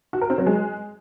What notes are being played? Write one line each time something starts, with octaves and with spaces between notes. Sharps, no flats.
F#4
A#4
C4
F#3
G#3